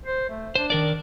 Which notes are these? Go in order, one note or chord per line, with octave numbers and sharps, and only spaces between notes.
C5
A3
D4 C5
D#3 A#4 D5